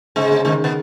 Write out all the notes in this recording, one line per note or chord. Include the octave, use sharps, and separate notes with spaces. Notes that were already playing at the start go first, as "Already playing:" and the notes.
G#2 C#3 G#3
C#3
G#2 D#3 G#3
B2 B3